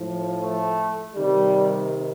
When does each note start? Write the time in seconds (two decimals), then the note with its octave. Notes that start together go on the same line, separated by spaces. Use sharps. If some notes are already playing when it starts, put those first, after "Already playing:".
Already playing: A2 F3
0.41 A3
1.15 C3 D#3 G3